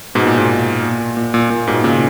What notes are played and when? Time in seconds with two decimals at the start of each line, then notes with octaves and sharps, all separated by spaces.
0.15 G#2 B2
0.27 A#2
0.38 G#2
0.82 A#2
1.17 A#2
1.34 A#2
1.50 A#2
1.67 G#2 B2
1.84 A#2 C#3